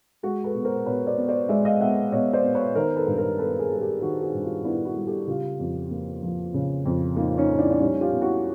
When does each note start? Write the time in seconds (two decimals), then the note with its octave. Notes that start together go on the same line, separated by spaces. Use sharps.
0.23 G#3 F#4 G#4
0.44 A4 B4
0.54 B2
0.65 A#4 C5
0.86 B2 B4 C#5
1.07 C5 D5
1.18 B3
1.28 C5 D5
1.49 G#3 D5 E5
1.65 D#5 F5
1.81 B2 E5 F#5
2.12 B2 C#5 D#5
2.33 C5 D5
2.44 B3
2.55 B4 C#5
2.75 D#3 A#4 C5
2.96 A4 B4
3.07 G2
3.18 A#4 C5
3.38 B3 A4 B4
3.59 G#4 A#4
3.70 G3 A#4
3.81 G4 A4
4.01 D#3 F#4 G#4
4.23 F#4 G#4
4.34 G2
4.44 F4 G4
4.64 B3 D4 E4
4.85 E4 F#4
4.96 G3
5.07 G4 A4
5.27 C#3 F4 G4
5.60 F2
5.91 A#3
6.23 F3
6.54 C#3
6.85 F2
7.16 A#3 D#4 F4
7.38 C#4 D#4
7.48 F3
7.58 D4 E4
7.71 D4
7.80 G3 C#4 D#4
8.01 F4 G4
8.11 B2
8.22 E4 F#4